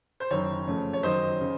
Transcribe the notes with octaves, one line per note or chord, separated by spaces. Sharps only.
C5
F#1 F#2 D#3 C#5
F2 C#3 A3 C#4
C#5
F#2 D#3 F#3 C5 D#5
C#3